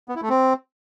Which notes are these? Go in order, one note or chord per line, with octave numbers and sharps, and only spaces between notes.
B3
E4
A3
C4